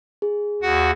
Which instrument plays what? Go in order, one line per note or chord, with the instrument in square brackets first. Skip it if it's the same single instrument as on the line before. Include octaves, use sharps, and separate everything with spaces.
[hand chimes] G#4
[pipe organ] D#2 F#4 F#5